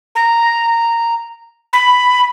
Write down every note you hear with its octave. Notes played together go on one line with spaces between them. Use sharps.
A#5
B5